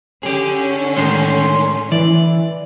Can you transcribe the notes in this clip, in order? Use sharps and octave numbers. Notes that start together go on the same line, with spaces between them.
D3 C#4 G4 G#4
A2 D#3 G#3 C6
E3 D5